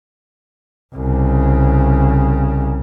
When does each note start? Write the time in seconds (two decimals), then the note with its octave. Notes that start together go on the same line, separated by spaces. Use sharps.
0.95 C2 C#3